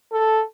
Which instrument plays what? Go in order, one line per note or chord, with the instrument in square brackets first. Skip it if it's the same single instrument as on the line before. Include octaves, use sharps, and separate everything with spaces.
[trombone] A4